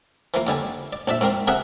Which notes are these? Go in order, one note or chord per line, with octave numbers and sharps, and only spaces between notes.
E3 F3 A#3
D#2 D3 G3 G#5
D5
A#1 D4 D5 E5
G#2 A#3 C4 A#4
C3 G#4 A#4 E5 F#5 D#6